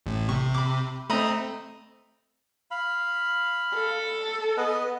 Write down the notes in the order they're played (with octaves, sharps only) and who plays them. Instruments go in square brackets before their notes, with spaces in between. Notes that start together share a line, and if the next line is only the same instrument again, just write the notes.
[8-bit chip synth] A1 A2
[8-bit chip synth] C3 [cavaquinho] C#6
[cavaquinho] B5 D6
[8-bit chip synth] A3 C4 [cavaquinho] D#5 A#5 B5
[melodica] F5 B5
[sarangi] A4
[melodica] B3 B4 D#5